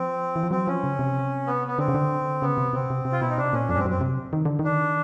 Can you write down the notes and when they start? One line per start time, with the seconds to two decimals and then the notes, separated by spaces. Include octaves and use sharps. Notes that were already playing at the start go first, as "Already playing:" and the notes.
Already playing: F3 C4
0.36 E3
0.43 F3
0.51 F#3 C4
0.67 F3 C#4
0.84 C#3
0.99 C3
1.47 B3
1.67 B3
1.78 D3 C4
1.88 C#3
1.94 D3
2.42 C#3 B3
2.58 C3
2.73 C3 C4
2.90 C3
3.05 C3
3.12 F4
3.21 B2 E4
3.29 D#4
3.37 C3 D4
3.53 A#2 C#4
3.69 F2 D4
3.74 C#4
3.78 G2 C4
3.85 F#2
3.90 C4
4.01 C3
4.33 D#3
4.45 D3
4.59 D#3 D4